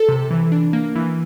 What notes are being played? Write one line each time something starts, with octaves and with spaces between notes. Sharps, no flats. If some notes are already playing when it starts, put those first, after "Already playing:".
Already playing: A4
C3
E3
D4
A#3
E3